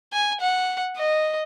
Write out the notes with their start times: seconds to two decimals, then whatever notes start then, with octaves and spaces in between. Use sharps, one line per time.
0.13 G#5
0.41 F#5
0.97 D#5